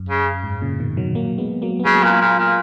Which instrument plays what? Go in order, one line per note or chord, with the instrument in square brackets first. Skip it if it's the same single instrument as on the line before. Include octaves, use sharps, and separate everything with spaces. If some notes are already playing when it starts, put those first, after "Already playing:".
Already playing: [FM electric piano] F#2
[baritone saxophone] C#3
[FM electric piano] G#2
A#2 C#3
B2 D#3
D#3 F#3
F#3 A#3
G#3 B3
F#3 A#3
B3
[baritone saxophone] C#3 [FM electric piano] F#3 A#3
[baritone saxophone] A#2
A#2
A#2